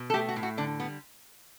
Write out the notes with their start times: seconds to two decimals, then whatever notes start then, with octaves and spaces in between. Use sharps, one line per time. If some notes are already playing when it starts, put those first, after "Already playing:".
Already playing: B2
0.10 A4
0.14 A3 G4
0.29 F#4
0.36 A2
0.43 F#4
0.57 D3 D4
0.80 G3 B3